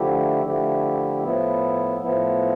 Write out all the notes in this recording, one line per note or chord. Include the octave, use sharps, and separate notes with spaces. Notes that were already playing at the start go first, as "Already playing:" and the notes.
Already playing: D3 F3 A3 E4 G4
D3 F3 A3 E4 G4
A2 F3 B3 E4
A2 F3 B3 E4